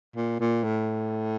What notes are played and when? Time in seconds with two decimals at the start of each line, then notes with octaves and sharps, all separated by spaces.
0.16 A#2
0.40 A#2
0.64 A2